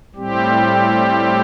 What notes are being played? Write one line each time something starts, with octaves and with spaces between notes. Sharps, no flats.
A2 G3 C4 G4